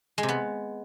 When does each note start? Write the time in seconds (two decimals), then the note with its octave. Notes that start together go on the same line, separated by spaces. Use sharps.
0.18 G#3
0.23 C3
0.28 B3